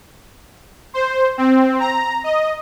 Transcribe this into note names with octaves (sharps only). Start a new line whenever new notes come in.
C5
C4
A#5
D#5